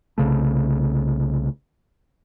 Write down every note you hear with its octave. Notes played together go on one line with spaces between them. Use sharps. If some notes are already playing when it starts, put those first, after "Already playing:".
C2 C#3 A3